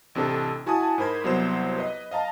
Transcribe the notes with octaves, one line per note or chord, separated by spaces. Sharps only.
A1 C3 D4 A4
E4 F#4 G#5 A5 D#6
G#2 A#4 C5 B5 G#6
C2 F#3 B3 C5 E7
B4 D#5
D#5 F5 A5 A#5